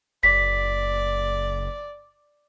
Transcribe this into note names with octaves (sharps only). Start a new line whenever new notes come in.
F#1 D5 B6